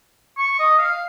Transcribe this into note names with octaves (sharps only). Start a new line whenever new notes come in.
C#6
D#5
F5